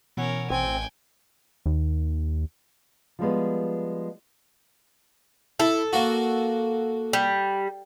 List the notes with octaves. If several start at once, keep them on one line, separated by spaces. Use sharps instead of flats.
B2 E3 C#4 A#4 F#5
A1 C4 G5 G#5
D#2
F3 G3 G#3 B3
E4 A4
A#3 F#4
G3